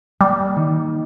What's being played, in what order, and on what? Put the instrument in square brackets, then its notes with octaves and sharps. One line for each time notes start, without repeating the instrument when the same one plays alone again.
[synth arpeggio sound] G3 [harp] A#3
[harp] D#3